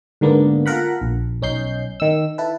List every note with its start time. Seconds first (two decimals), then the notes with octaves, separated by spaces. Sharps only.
0.21 G#2 D3 A#3 B3
0.66 F4 A4 A#4 F#5 B5
1.02 A#1
1.42 B1 C#4 D#4 G6 C7
2.00 D#3 E6
2.38 E4 A4 B4